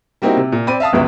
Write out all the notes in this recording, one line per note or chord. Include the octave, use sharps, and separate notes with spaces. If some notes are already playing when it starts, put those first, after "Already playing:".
G3 A#3 C4 D#4 E4 F#4
C3
A#2
C4 D5 B5 D#7
E5 F5 A5 D#6
G1 C#2 F#2 B4 E5